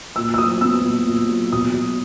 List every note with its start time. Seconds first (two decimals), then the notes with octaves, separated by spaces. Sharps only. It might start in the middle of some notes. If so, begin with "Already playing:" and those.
0.16 A#2 E6
0.34 E6
0.38 F#3 D#6
0.61 B3 E6
0.83 A#2
1.06 A#2
1.29 F#3
1.52 B2 D#6
1.74 F#3